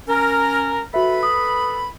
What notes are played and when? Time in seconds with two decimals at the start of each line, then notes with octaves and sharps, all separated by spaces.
0.08 C#4 A#4
0.94 F#4 A4 B4 E5 B5
1.23 D#6